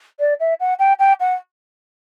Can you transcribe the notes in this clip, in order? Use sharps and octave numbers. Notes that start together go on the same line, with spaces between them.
D5
E5
F#5
G5
G5
F#5